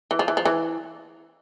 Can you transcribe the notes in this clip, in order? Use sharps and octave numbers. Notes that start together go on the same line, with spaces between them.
E3
F3
E3
F3
E3